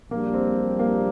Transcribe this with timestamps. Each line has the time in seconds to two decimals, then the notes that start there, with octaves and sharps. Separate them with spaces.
0.11 A#1 A#2 G3 A#3 D4 G4
0.34 C4
0.79 A#3